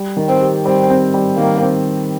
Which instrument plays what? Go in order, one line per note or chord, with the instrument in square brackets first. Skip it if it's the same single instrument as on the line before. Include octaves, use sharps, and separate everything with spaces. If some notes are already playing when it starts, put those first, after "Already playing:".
Already playing: [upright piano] G3
D#3
[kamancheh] C4
[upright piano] G4
[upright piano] G3 [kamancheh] C4
[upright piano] C4
G3
[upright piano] D#3 [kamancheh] A#3
[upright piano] C4